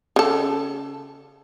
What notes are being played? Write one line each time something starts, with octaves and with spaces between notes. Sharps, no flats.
C#3 A4